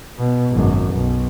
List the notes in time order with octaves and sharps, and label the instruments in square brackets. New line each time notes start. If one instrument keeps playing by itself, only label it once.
[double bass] B2
G#1 F#2
B1